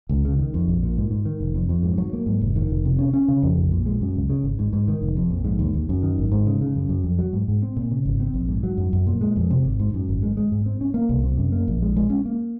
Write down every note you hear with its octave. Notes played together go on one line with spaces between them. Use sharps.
C#2
C#3
D#3
F2
A#1
A#2
G#2
G#2
D#3
F1
F2
F2
G#2
F#3
A#3
G#2
F1
D#3
F1
C3
C#4
C#4
C#3
F2
A#1
A#2
G#3
F#2
C#2
C#3
G#1
G#2
G#2
D#3
F1
F2
A#1
G#2
D#2
D#2
F#2
D#3
G#1
G#2
C#3
C#3
F#2
F#2
F2
F#3
G#2
G#2
C4
A#2
C#3
G#1
C4
A#1
G#2
F#3
F#2
F#2
A#2
G#3
F2
C3
G#1
G#2
F#2
G#1
G#3
G#3
G#2
C4
C#4
A#3
C2
C3
F#2
A#3
A#1
G#3
G#3
C#4
A#3